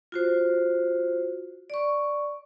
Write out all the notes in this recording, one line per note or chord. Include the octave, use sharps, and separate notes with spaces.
F4 F#4 C5
D5 C#6